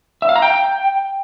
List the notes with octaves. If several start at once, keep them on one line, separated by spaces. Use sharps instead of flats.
E5
F5
A#5
G5